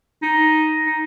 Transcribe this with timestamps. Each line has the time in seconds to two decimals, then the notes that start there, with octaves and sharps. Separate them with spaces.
0.22 D#4
0.85 D#4